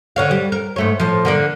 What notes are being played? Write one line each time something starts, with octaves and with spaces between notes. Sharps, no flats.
D3 C#5 F5
G3
A#4
G#2 A3 C#5
A2 F3
D3 A#3 D5